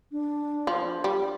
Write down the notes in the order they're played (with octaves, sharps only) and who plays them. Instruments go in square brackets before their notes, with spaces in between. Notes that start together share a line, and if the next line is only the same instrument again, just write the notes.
[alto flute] D4
[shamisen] F3
[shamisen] G3 [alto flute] G4